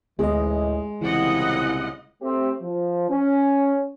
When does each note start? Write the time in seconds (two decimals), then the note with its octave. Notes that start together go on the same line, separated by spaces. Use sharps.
0.19 A1 D2 G#2 E3 G#3 D#5
1.01 C2 A#2 C#3 E3 E4 D#5 F#5
2.22 A3 C4 G4
2.62 F3
3.10 C#4